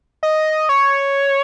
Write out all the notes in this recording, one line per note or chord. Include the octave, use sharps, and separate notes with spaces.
D#5
C#5